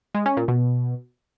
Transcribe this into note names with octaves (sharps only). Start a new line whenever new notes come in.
G#3
C#4
A#2
B2